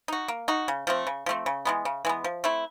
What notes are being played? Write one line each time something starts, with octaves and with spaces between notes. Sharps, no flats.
D#4 F#4
A#3
D#4 F#4
C#3
F3 A3 C4
C#3
F3 A3 C4
C#3
E3 G#3 B3
C#3
E3 G#3 B3
F3
A3 C4 E4